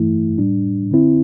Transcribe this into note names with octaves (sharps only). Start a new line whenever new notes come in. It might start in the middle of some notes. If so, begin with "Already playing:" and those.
Already playing: G2 E3 A3 E4
A2 G3 D4
D3 C4 E4